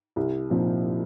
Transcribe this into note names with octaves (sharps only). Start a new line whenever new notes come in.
C2
A#2 F3 C4 D#4